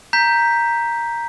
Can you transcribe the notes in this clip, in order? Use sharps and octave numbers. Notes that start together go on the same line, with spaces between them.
A#5 G6 B6